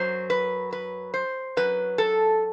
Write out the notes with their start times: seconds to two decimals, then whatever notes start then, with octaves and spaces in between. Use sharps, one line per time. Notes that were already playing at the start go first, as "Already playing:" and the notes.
Already playing: F#2 F#3 C5
0.30 B4
0.73 B4
1.14 C5
1.57 F#2 F#3 B4
1.98 A4